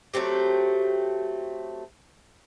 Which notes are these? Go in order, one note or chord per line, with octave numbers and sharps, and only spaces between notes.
F#3 A3 C4 G4